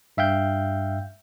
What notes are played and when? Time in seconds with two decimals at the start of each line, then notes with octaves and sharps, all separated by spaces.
0.17 G2 E5 F5 G5 G6